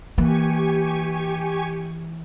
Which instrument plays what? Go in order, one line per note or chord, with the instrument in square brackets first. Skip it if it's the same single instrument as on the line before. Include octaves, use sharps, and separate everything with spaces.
[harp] E3 [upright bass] A#3 [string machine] G4 G#5 C#6